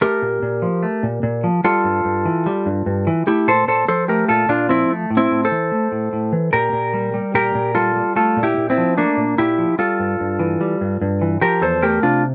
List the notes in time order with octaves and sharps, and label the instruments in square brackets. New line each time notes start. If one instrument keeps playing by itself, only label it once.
[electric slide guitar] A3 G4 A#4
A#2
A#2
F3
A3
A#2
A#2
F3
G3 F4 A4
G2
G2
E3
G3
G2
G2
E3
A3 E4 G4
A#2 A4 C5
A#2 A4 C5
F3 A4 C5
A3 G4 A#4
A#2 F4 A4
A#2 D4 F4
F3 C4 E4
A3
A2
C4 E4
A2
A4 C5
E3
A3
A2
A2
E3
A#2 G4 A#4
A#2
G3
G3
A#2 G4 A#4
A#2
G3 F4 A4
G3
A3 F4 A4
A#2
E4 G4
A#2
C4 E4
F3
A3 A#3 D4
A#2
A#2 E4 G4
F3
G3 F4 A4
G2
G2
E3
G3
G2
G2
E3
F3 G4 A#4
E2 A4 C5
A3 G4 A#4
C3 D4 F4